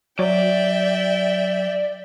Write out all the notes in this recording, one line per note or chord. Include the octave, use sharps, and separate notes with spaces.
F#3 D5 E5 G5